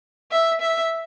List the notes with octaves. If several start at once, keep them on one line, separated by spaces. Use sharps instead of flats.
E5
E5